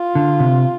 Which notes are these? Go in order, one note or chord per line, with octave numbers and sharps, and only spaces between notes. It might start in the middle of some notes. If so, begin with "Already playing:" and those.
Already playing: F4
D3
C3